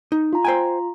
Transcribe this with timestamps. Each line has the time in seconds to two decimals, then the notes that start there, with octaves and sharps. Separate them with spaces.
0.12 D#4
0.33 F4 A#5
0.45 C5 G5 G#5